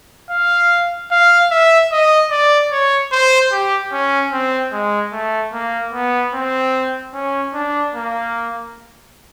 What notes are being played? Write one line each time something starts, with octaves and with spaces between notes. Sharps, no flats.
F5
F5
E5
D#5
D5
C#5
C5
G4
C#4
C4
G#3
A3
A#3
B3
C4
C#4
D4
A#3